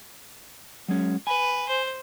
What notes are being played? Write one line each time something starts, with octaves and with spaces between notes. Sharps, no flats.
F#3 G#3 C#4
B4 G#5
C5